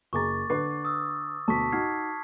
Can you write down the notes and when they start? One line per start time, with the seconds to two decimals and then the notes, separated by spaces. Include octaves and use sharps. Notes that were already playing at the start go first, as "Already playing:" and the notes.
0.13 F#1 G#4 A#5 C#6 D6 A6
0.50 D3 B4 D6 C7
0.85 D#6 E6
1.48 D2 B2 A5 C#6 B6
1.72 D#4 F#4 F6 G#6 C7